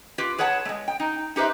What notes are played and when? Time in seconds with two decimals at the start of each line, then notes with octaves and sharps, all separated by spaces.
0.18 F4 G4 B4
0.38 G#4 B4 C#5 F#5 A5
0.65 G#3 A3
0.88 G5
1.00 D#4
1.36 D#4 G4 B4 C5 E5